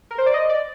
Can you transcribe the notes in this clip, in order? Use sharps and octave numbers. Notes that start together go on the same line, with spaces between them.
A#4
C5
D5
D#5
D5